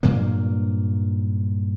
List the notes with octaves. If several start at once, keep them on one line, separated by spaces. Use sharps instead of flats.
G2 A#2 F#3 A#3